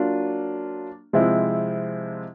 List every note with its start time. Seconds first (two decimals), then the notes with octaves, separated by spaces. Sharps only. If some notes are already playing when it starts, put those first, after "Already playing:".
Already playing: F#3 A#3 D4 F4
1.13 C3 F3 G#3 C4 E4